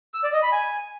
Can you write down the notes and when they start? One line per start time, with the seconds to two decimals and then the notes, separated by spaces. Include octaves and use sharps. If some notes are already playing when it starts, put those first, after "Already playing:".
0.14 E6
0.23 D5
0.33 D#5
0.42 B5
0.52 G#5